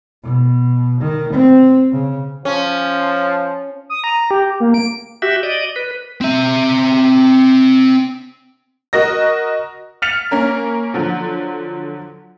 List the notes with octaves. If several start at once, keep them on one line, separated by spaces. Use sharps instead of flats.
B2
D#3
C4
C#3
F3 C#4
D#6
A#5
G4
A#3
D7
F#4 G4 E5
D5 D#5
B4
C4 E5
F#4 A#4 D#5 A#6
F6 A6 B6 C#7 F7
A#3 C#4 A#4
D3 F3 F#3